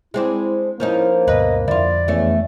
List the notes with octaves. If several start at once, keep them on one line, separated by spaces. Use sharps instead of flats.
G#3 C4 D4 E4
F3 A#3 C#4 D#4 E4
D2 G2 B2 B4 D#5
F2 D3 E4 F4 D5
E2 A3 C#4